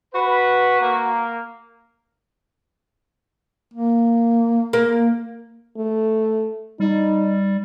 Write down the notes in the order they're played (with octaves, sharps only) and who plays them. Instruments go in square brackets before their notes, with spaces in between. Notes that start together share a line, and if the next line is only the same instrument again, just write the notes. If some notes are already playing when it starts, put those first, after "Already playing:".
[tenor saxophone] F#4 [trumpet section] B4
[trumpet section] A#3
[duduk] A#3
[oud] A#3
[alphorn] A3
[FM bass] G3 [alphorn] D#4